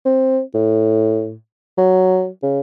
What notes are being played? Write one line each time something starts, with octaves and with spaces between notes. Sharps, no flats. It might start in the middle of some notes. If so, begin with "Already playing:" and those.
C4
A2
F#3
C#3